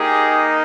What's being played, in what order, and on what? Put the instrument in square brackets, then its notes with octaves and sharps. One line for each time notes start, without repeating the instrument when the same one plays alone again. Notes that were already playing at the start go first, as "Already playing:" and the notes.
Already playing: [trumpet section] A#3 D#4 G4 G#4